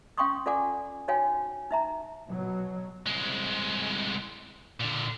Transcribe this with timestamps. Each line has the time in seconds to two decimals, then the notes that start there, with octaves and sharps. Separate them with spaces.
0.18 C#4 F5 G5 C6 C#6 D#6
0.46 F4 A4 D5 F#5 G#5 D6
1.08 D#4 F#4 C#5 F5 G5 G#5
1.71 D#4 E5 A#5
2.30 B2 F#3
3.06 C2 G#3
4.80 A#2 D3